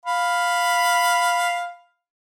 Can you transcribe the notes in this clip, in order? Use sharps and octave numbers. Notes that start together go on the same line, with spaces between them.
F5 B5